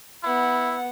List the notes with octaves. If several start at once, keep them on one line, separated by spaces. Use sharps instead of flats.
B3 E4 F#5